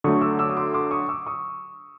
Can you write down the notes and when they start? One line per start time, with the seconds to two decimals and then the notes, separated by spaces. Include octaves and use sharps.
0.04 D3 F#3 A3 C#6 D#6
0.21 D6 E6
0.39 D6 E6
0.50 D#6
0.57 C6 D6
0.74 C6 D6
0.91 C#6 D#6
1.09 D6 E6
1.26 C#6 D#6